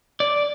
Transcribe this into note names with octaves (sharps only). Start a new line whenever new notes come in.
D5